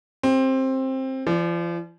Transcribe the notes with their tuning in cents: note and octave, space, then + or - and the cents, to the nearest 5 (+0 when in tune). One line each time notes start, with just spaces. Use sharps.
C4 +15 G4 +20
F3 -40 D5 +0